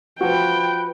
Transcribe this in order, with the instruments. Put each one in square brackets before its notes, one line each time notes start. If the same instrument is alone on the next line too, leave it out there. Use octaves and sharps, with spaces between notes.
[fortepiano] F3 F#4 [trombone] B4 [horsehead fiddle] G5